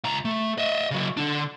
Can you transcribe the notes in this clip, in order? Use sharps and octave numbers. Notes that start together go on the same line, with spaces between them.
C#2 A#5
A3
D#5 E5
C#3 F#3
D3 D4